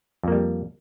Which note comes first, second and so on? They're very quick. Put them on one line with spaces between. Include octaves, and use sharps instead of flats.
F2 A#3 G3